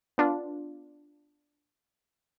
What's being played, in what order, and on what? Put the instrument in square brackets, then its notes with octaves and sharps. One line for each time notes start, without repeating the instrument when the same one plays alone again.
[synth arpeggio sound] B3 D4 F4